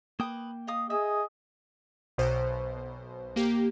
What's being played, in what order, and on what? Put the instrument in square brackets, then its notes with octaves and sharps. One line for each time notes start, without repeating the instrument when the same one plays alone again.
[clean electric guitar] A#3 G5 [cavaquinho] B4 D#6
[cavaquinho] D#5 F5 D#6
[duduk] G#4 [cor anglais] D#5 [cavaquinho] E5
[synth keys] B1 B2 C5
A#3 G4